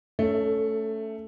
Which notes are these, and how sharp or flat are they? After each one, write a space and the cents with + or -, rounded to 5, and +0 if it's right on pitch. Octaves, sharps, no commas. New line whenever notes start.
A3 +0 C#4 +15 A4 +30